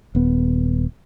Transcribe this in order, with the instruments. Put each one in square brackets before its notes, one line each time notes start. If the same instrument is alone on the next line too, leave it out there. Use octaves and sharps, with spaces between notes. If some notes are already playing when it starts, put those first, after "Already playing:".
[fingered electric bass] D#1 B3